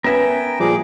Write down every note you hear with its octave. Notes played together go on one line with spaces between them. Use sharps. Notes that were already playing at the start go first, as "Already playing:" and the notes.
B3 C#4 A#4 E5 G5 G#5
A#2 F3 G3 F4 G#4 D6